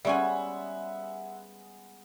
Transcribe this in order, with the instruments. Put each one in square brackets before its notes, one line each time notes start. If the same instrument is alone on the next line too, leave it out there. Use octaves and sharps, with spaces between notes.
[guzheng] G3 C#4 G#5 [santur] G#3 B3 G#4 [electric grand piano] E5 F#5